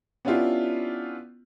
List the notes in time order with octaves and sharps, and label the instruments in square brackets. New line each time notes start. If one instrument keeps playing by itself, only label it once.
[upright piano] B3 C#4 D4 E4 F4 G4